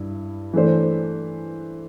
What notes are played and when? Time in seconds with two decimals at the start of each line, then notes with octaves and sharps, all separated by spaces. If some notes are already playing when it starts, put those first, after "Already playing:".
Already playing: G2 E4
0.53 E3 A3 D4 C5